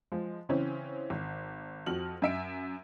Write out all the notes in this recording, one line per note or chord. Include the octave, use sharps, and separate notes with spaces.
F3 G#3
C#3 E3 C4 C#4
G#1
F2 F#4 F6 F#7
F#2 E5 D7